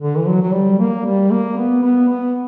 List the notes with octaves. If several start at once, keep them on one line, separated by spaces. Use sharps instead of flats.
D3
E3
F#3
F#3
G3
A#3
G3
A#3
B3
B3
B3